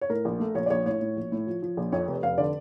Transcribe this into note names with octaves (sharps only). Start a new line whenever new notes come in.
C#5
A2 A#4
A#1
A3
A#1 C#5
D5
A#1 C#5
A2 C#5
A2
A#1
A2
F3
F3
A#1
F2 C#5
F1 C#5
F1 F5
D3 D5